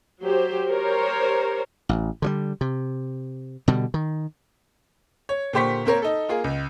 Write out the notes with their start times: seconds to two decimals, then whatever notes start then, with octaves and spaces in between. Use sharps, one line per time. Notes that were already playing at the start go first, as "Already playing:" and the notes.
0.24 F#3 G4 C5
0.70 G4 A#4 C5 C#5
1.89 A1
2.22 D3 F3 G3
2.61 C3
3.68 B2 D3 G3
3.94 D#3
5.29 C#5
5.53 A#2 D3 G4 C5 C#6 B6
5.85 A#3 C4 A#4 C#5
6.02 D#4 A4
6.29 A#3 F4 G#4
6.44 C#2